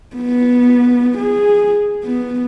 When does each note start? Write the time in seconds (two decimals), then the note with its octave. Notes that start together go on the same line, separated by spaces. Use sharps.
0.16 B3
1.18 G#4
2.04 B3